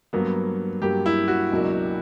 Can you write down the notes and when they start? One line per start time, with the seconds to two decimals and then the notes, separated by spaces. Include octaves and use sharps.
0.13 G2 F#3 A#3 B3
0.82 G2 F#3 A#3 G4
1.06 E4
1.28 F#4
1.51 C#2 B2 F#3 A#3 D4